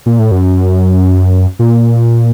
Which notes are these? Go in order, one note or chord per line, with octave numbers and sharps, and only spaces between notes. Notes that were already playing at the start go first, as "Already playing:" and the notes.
A#2
A2
F#2
A#2